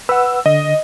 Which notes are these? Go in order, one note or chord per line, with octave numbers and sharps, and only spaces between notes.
B4 F#5 E6
D3 D#5